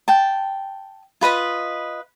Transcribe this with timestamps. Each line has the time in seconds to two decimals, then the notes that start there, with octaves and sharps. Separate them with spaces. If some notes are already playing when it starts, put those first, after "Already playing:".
0.08 G5 A5
1.21 F4 B4 D#5 B5